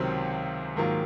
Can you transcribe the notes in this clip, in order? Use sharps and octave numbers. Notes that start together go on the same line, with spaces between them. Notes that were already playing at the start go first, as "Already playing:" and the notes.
Already playing: C#2 C3 D#3 F#3 C4
G#2 D#3 F#3 A#3 F4